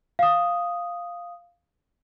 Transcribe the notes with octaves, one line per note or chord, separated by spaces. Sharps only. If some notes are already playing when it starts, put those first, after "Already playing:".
F5 D#6